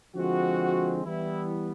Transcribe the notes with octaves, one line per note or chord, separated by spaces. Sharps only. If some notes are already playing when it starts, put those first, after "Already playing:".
D3 F3 G#3 C4 F#4
E3 G3 B3 E4